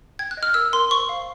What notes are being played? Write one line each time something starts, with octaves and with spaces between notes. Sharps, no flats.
G5 G#6
F#6
D#5
F6
A#4 E6
A#4 C6
C5 C#6
F5